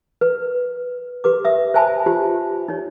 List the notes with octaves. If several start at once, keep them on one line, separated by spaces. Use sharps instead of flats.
B4
G4 B4 D6
E5 D#6
C5 E5 G#5 A5 B5
F4 G4 C5
D#4 C#5